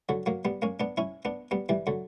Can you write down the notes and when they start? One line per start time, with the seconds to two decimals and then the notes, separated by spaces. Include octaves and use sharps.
0.09 D3 F#3
0.26 F#3 A#3
0.45 G3 B3
0.62 A#3 C#4
0.80 B3 D4
0.97 C#4 E4
1.25 B3 D4
1.51 G3 B3
1.69 E3 G3
1.87 D3 F#3